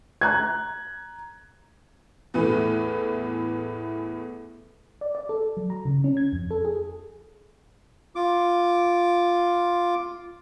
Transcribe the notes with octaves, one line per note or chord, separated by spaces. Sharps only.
A#5 F#6 G#6
E2 A2 E3 A3
D5
D5
A4
F#3
A#5
C#3
C#4
G#6
F2
A4
G#4
F4 D6